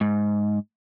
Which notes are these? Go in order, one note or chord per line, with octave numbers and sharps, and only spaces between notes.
G#2